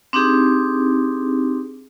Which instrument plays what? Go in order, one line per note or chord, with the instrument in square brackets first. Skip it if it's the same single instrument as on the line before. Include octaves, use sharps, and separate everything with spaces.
[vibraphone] C4 D4 D#4 G4 G#4